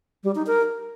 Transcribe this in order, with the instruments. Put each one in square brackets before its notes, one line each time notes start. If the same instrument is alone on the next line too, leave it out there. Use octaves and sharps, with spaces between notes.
[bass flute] G3
D#4
A#4